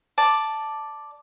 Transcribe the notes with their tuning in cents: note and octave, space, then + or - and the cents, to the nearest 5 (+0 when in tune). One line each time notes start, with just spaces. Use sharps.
D5 +5 A5 +0